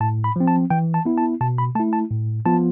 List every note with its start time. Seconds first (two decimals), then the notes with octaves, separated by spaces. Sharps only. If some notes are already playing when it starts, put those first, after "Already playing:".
0.01 A2 A5
0.24 B5
0.36 F3 C4
0.48 A5
0.70 E3 G5
0.94 A5
1.05 B3 E4
1.18 A5
1.41 B2 A5
1.58 B5
1.75 A3 A5
1.80 E4
1.93 A5
2.11 A2
2.46 F3 B3 F4 A5